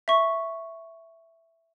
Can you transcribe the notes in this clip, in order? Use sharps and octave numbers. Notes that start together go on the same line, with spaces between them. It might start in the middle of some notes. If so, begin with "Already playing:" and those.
E5 C#6